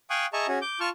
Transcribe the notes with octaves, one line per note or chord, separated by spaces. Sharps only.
F5 G5 G#5 C#6 D#6 F#6
G#4 D#5 E5 A5 A#5 C#6
C#4 F#4 G#4
D6 G6
F4 A5 C#6 F6